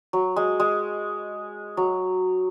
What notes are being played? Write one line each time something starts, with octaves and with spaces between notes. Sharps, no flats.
F#3
G#3
G#3
F#3